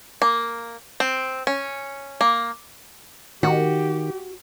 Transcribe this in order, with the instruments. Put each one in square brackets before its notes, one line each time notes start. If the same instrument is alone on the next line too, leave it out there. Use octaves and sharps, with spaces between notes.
[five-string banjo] A#3
C4
C#4
A#3
[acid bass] D#3 [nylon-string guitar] F#4 [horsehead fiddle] G4